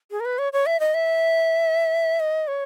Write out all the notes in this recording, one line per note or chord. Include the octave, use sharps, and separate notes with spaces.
G#4
A#4
B4
C#5
C#5
E5
D#5
E5
D#5
C#5